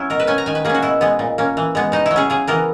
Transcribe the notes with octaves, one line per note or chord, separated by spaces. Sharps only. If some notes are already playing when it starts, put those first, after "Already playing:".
Already playing: F#3 C#4 E4
B2 A#4
B4
F#3 C#4 G#5
A#5
D#3 G#5
B4
A#3 C#4 G#4
F#4
B2 E4
G#3 B3
A#2
A#3 C#4
E3
G#3 B3
B2 D#4
E4
F#3
C#4 G#4
C#3 G#4
E3 B3 A#4